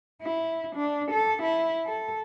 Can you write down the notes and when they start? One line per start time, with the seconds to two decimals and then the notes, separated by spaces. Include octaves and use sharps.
0.22 E4
0.76 D4
1.11 A4
1.43 E4
1.86 A4